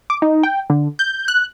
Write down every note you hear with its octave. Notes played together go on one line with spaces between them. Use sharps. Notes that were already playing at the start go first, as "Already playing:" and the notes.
D6
D#4
G5
D3
G6
F#6